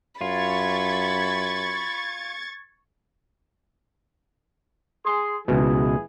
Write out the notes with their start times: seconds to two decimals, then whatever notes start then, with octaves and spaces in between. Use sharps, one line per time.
0.21 F#2 F4 B5 C#6 G#6 A6
5.05 G#4 C6
5.48 C#2 B2 E3 E4 G#4